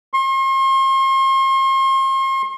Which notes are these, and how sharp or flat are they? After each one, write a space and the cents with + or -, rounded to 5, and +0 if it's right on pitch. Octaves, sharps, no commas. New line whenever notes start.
C6 +40